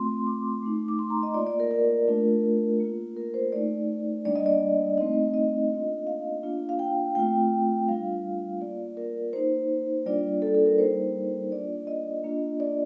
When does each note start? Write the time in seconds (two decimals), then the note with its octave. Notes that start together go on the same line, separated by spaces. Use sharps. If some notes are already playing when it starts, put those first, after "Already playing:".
Already playing: A3 C4 F4 C6
0.27 D6
0.63 A3 D#4
0.88 D6
0.99 C6
1.10 A#5
1.23 D#5
1.34 A#3 F4 D5
1.47 D5
1.60 A#4
1.71 A#4
2.08 A3 D4 F4
2.80 A#3 F4
3.16 A#4
3.34 C5
3.52 A3 D#4 D5
4.25 G3 A#3 D4 D5
4.36 D#5
4.46 D5
4.98 A3 C4 D#4 D#5
5.34 D#5
5.71 A#3 D4 F4
6.07 F5
6.43 A#3 D4 F4
6.69 F5
6.79 G5
7.15 A3 C4 F4 G5
7.88 G3 D4 F4 F5
8.61 A#3 F4 D5
8.97 A#4
9.33 A#3 D#4 C5
10.06 G3 A#3 D4 F4 D5
10.42 A4
10.54 A4
10.66 A#4
10.78 G3 A#3 D#4 C5
11.52 A#3 D4 F4 D5
11.87 D#5
12.24 A#3 D4 F4
12.60 D5